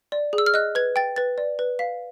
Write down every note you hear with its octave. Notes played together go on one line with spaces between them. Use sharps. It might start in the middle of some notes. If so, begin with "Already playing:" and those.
D5
G#4
E6
F6
D#5 F#6
B4 G#6
G5 A6
B4 A6
D5
B4
F5 B6